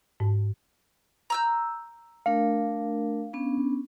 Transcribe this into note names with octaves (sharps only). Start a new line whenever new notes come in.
G#2
A#5 E6 G6
A3 D4 A#4 F5
B3 C#4 D4